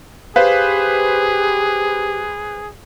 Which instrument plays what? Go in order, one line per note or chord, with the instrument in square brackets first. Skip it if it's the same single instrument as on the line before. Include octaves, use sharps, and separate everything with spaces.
[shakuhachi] G4 [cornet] G#4 [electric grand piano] B4 C5 [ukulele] F5